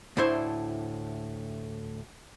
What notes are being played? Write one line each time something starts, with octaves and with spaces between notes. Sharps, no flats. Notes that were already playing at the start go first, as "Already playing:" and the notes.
D2 A2 D4 E4 C5 E5